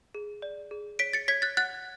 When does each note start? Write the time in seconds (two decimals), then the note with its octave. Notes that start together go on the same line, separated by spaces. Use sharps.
0.15 G#4
0.42 D5
0.71 G#4
0.99 C#5 B6 D7
1.13 A6 C#7
1.28 C#5 G#6 B6
1.42 F#6 A6
1.57 F#5 F#6 A6